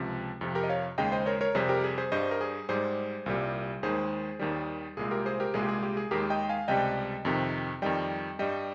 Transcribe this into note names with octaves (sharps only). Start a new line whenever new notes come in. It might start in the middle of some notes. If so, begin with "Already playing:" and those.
Already playing: C#2 C3 F3
F2 C3 F3
G4 A#4
D#5
C#5 F5
D#2 C#3 G#3 D#5 G5
C5 D#5
A#4 C#5
A#4 C#5
F2 C3 G3 G#4 C5
G4 A#4
G#4
G#4 C5
G2 G3 C5 D#5
A#4
G#4
G#2 G3 G#4 C5
C2 A#2 G3
D#2 D#3 G#3 G#4 C5
D#2 D#3 G3
C2 A#2 G#3 G#4
G4 A#4
G#4 C5
G4 A#4
C2 A#2 G#3 G#4
G4
G#4
G4
G#4
D#2 D#3 G#3 G4 A#4
D#5 G5
F5 G#5
C#2 C3 G3 D#5 G5
F2 C3 D#3
F2 D#3 G3 D#5 G5
G2 G3 D#5 G5